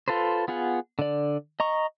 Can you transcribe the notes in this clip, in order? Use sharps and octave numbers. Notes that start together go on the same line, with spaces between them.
F4 A4 B4 C5
B3 F4 G#4 F#5
D3 D5
D#5 A#5 C#6